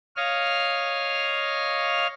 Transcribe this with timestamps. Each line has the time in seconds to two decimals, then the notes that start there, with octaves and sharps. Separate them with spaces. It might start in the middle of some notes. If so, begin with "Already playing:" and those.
0.16 C#5 D#5 F5 F6